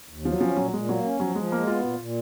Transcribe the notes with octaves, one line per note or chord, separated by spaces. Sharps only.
D#2
F3 F#3
F3 C#4
A#2 F#3
A#2 G#3
F#3 A#3
C#4
F3 F#3
F3 G#3
G#3 A#3
B3 F4
A#2 F4
A#2